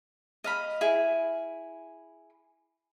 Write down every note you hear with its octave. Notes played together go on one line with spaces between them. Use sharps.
D#5 F5 B5
E4 G#4